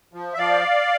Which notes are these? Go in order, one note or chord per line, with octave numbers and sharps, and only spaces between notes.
F3
E5
F3 D5 F5